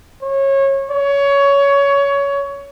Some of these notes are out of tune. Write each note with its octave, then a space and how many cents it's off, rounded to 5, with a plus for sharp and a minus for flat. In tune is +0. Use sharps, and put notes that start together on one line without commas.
C#5 -25
C#5 +20